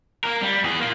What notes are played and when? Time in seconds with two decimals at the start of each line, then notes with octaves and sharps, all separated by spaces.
0.24 A#3 A#4
0.42 G3
0.64 E2 G#4
0.80 A#3 F4